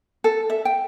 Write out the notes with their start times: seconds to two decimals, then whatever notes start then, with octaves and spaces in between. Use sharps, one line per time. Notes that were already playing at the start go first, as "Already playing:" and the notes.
0.24 A4
0.50 E5
0.65 G5